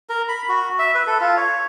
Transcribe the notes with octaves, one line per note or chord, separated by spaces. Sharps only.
A#4
B5
F#4
E5
B4
A4
F4
C#5